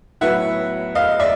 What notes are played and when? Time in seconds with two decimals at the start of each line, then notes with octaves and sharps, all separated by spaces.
0.21 A2 F#3 B3 E5 F#5
0.95 D#5 F5
1.20 D5 E5